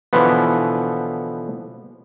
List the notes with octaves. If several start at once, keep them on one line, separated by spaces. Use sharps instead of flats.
B2 D3 E3 F3 B3